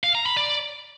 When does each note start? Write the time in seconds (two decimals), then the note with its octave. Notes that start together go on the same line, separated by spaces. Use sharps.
0.04 F5
0.15 A#5
0.26 B5
0.37 D5